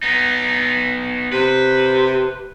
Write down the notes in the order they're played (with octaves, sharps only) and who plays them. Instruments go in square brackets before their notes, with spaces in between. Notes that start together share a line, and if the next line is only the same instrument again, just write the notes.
[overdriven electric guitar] B3 D#4
[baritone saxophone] C3 [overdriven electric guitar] B4